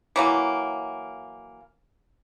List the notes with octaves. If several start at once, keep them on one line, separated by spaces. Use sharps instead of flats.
E3 F#3 A#3